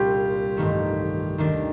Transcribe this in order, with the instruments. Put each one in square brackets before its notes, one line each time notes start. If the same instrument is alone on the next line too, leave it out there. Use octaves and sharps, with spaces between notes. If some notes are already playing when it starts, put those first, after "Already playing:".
Already playing: [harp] C2 A#2 G3 D4 [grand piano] F4 G4
[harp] A1 G2 D#3 A3
D#2 D#3 A3 D4